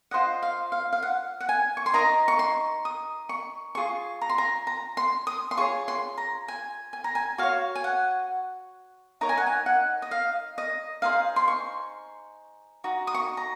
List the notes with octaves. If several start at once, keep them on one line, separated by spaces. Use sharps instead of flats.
F4 C5 D#5 F#5
F5
F5
F5
F#5
F#5
G#5
C#6
C6
D#4 A#4 D#5 A#5
C#6
C6
D#6
C#6
F4 G#4 C#6
A#5
C6
A#5
A#5
C6
D#6
C6
F4 G#4 C#5 C#6
C6
A#5
G#5
G#5
A#5
G#5
F#4 C#5 F5
G#5
F#5
D#4 A#4 C#5 A#5
G#5
F#5
G#5
F#5
D#5
F5
D#5
D#4 G#4 C5 F5
C6
C#6
D#4 F#4
D#6
C#6
A#5